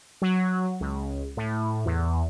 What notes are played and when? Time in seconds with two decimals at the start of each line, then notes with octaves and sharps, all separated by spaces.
0.22 F#3
0.80 C#2
1.37 A2
1.86 E2